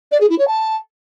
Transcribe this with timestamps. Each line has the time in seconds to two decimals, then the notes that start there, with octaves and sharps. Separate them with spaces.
0.12 D5
0.21 G#4
0.30 E4
0.39 C#5
0.48 A5